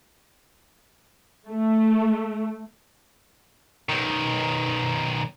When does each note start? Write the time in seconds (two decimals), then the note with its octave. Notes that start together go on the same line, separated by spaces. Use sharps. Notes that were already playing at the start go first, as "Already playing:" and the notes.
1.49 A3
3.89 B1 D#3